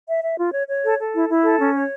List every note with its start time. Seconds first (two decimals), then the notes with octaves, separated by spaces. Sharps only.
0.08 E5
0.22 E5
0.39 F4
0.53 C#5
0.68 C#5
0.84 A4
0.98 A4
1.14 E4
1.28 E4
1.44 A4
1.59 C#4
1.75 C#5